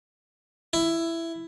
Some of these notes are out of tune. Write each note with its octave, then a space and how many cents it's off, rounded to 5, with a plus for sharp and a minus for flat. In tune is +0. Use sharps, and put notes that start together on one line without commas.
E4 +10